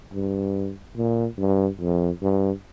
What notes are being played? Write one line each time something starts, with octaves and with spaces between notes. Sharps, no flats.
G2
A#2
G2
F2
G2